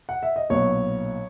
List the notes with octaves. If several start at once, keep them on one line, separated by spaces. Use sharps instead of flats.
F#5
E5
D#5
B1 A#2 F#3 B3 C#5